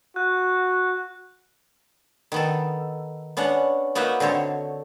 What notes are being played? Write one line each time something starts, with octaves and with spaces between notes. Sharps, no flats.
F#4 F#6
D#3 B3 A4
B3 C#4 D4 C#5 F#5
A#3 B3 D#4 F#4 B4 E5
D3 C4 A4 C#5